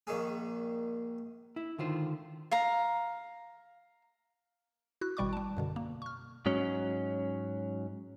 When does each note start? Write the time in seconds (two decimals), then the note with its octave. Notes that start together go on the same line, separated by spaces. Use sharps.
0.07 A#1 D#3 G#4
1.56 E4
1.78 D3 D#3 F4 C5
2.51 F5 A#5
5.01 E4 F#4 F#6
5.17 G#1 B2 G3 D5 C#6 D6
5.33 G3 A5
5.57 F#2 B2 D3
5.76 A#3
6.02 C#6 F6
6.46 G#2 F#3 C#4